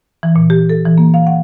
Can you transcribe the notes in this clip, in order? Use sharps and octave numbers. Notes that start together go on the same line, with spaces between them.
E3
A#2
G4
A4
E3
A#3
F5
F#5